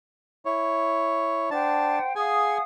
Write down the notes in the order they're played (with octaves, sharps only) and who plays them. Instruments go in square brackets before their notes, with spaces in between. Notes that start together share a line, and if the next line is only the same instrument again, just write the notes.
[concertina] E4 C#5
[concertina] D4 A5 [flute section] C5 F#5 G5
[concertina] G#4 G#5 [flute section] F5 F#5 D#6